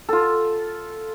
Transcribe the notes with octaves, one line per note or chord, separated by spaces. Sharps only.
F4 A4